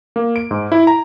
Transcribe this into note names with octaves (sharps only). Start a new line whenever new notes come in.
A#3
D7
G#2
E4
A#5